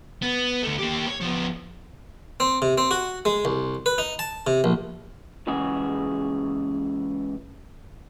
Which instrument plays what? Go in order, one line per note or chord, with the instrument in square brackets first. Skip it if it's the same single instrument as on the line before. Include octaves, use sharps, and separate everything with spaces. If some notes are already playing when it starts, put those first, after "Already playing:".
[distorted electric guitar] B3
D2 A3
A#3 G4
C#5
F3 B3
[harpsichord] C4
C3
C4
F#4
G#3
C2
B4
D#4
A5
C3
A#1
[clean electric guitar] C#2 C#3 E3 F#4 G#4